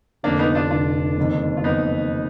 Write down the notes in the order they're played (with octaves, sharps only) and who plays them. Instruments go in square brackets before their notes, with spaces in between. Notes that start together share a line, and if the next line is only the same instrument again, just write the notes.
[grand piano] F1 F2 D3 [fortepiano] A#3 D4
[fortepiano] B3 D#4
D4 F4
[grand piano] F1 F2 D3 [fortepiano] D4 F4
[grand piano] F#1 F2 D#3
[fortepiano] F4
[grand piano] F#1 F2 D#3 [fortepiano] B3 D#4